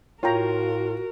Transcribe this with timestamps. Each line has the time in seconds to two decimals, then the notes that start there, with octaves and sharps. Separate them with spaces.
0.23 A2 F4 F#4 A#4 C#5 G5 A#5